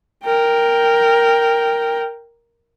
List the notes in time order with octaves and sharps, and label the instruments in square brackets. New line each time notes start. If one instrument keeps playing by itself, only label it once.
[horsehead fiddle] A#4 G5